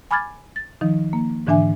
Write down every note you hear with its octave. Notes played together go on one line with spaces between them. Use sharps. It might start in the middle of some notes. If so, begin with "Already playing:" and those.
G#5 B5 D6 F6 G#6 A6
A6
D#3 F3 D#4
A#3
G#2 D3 E3 D4 E5 G#5